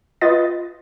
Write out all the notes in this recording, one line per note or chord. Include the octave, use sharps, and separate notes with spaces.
F4 B4 D#5 A6